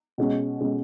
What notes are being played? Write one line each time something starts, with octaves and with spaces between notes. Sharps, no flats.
B2 G#3 C#4
B2 G#3 C#4